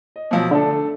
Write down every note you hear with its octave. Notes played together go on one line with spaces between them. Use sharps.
D#5
B2 F3 F#3
D3 A3 D4 A4